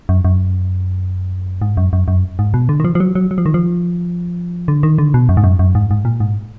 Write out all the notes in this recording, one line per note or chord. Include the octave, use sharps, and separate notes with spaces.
F#2
F#2
G#2
F#2
F#2
F#2
G#2
B2
D3
D#3
F3
F3
F#3
F#3
F#3
F3
D#3
F3
D3
D#3
D3
B2
F#2
G#2
F#2
F#2
G#2
G#2
A#2
G#2